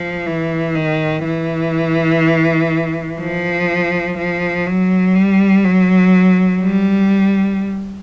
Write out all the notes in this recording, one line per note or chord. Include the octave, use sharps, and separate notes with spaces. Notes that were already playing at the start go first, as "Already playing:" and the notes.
Already playing: F3
E3
D#3
E3
F3
F3
F#3
G3
F#3
G3